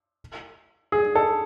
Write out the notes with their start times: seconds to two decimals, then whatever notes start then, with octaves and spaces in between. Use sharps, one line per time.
0.92 G#4
1.15 A4